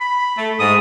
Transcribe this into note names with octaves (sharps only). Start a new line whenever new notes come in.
B5
A3
G#2 D#6